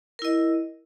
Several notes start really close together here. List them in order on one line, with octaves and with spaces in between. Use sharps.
A#4 E4 D#5